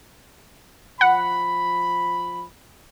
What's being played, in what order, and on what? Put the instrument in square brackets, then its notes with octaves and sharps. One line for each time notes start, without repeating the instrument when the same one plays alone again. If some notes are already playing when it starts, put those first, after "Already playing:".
[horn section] F3 B5 [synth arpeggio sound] F#5